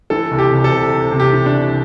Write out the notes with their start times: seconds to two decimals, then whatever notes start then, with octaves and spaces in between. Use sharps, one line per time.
0.10 E3 A4
0.31 C2
0.38 G4
0.52 C3
0.64 A4
0.72 C3
0.92 C3
1.12 C3
1.20 G4
1.33 E3
1.46 D4
1.53 C2